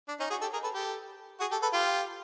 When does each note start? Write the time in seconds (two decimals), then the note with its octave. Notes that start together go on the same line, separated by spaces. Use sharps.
0.08 D4
0.20 C#4 D#4
0.30 F#4 G#4
0.41 G4 A4
0.53 G#4 A#4
0.63 A4 B4
0.74 G4 A4
1.40 F#4 G#4
1.51 G4 A4
1.62 A4 B4
1.73 F4 G4